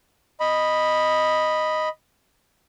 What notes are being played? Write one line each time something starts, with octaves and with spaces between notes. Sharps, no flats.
D#5 B5